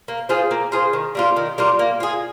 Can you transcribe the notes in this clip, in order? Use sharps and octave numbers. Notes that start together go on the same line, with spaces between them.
A#3
F4 G#4 C5
A#3
F4 G#4 C5
D#3
G3 A#3 F4
D#3
G3 A#3 F4
A#3
F4 G#4